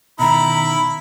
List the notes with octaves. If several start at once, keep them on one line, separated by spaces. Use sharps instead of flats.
B2 D#3 E4 A#5 B5